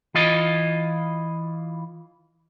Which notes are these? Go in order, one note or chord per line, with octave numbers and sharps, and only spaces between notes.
E3 F4 D#5